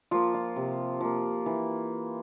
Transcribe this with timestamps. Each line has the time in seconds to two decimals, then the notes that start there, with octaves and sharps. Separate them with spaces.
0.11 F3 A#3 F4
0.34 F4
0.56 C3
1.01 F3 A#3
1.46 E3